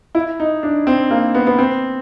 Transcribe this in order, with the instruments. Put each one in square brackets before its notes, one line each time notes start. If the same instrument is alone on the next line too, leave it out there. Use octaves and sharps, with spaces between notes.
[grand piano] E4
D#4
D4
C4
A#3
B3
B3
C4